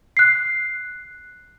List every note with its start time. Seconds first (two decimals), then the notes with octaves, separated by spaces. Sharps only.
0.17 F#6 C7